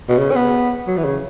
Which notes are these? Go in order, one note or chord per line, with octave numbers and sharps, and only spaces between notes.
B2
C#3
C#4
B3
F#3
E3
C#3